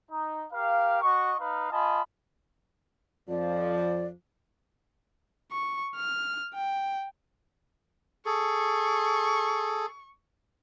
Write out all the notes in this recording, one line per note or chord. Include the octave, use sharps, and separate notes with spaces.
D#4
G4 A#4 F5
F#4 D#5 C#6
D#4 B4 F5
F4 D#5 G#5 A5 B5
F2 F3 D5
C#6
F6
G5
G#4 A4 C#6